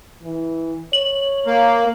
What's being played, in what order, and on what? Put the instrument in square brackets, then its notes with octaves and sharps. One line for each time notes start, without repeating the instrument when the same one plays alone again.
[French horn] E3
[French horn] C#5 [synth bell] F#7
[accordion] A#3